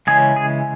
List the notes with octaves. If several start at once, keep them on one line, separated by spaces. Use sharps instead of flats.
C#3 E3 G#3 C#4 G#4
G#4